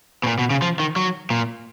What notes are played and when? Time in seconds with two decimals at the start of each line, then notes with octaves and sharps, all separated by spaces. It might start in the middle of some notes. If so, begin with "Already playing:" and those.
0.24 B2
0.27 A#2
0.39 B2
0.50 C#3
0.62 F3
0.79 D#3
0.96 F#3
1.30 A#2